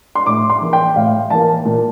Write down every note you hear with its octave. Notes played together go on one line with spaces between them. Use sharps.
C6
A2 D6
C6
E3 A#3
G5
A2 F5
E3 A#3 A5
A#2